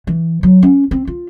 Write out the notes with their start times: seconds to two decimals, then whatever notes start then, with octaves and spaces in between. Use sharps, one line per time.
0.07 E3
0.43 F#3
0.62 C#4
0.91 C4
1.07 F4